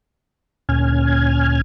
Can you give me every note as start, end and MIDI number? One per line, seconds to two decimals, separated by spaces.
0.69 1.61 38
0.69 1.61 46
0.69 1.61 61
0.69 1.61 80
0.69 1.61 89
0.69 1.61 92